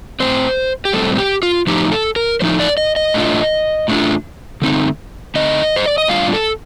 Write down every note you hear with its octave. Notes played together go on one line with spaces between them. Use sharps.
A2 G3 C4 C5
G4
A2 G3 C4 A4
G4
F4
A2 F3 A3 D#4 G4
A4
A#4
A2 F3 A3 D#4 C5
D5
D#5
D#5
A2 A3 D4 F4
A2 A3 D4 F4
D3 A3 C4 D#4
D3 A3 C4 D#4 D#5
C5
D5
D#5
A2 G3 D4 F4 F5
A4